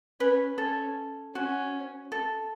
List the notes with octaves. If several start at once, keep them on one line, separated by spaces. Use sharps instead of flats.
C#4 B4
C#4 A4
C#4 F#4
A4